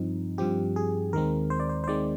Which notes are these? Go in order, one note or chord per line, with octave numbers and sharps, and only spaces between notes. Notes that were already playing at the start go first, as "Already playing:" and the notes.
Already playing: G2 F3 C4 D#4
G2 F3 C4 G4
G#4
D#2 D#3 G#3 C4 A#4
C5
D5
C5
C5
D#2 D#3 G#3 C4 D5